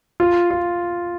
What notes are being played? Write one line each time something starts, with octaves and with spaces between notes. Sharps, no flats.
F4
F4